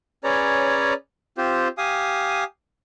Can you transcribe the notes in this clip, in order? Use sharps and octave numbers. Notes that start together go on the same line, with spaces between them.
C#4 G#4 B4 C#5 D5 A#5
C4 F4 G4 C5
G4 F5 G#5 D#6